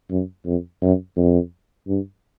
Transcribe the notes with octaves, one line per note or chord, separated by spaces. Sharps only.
F#2
F2
F#2
F2
G2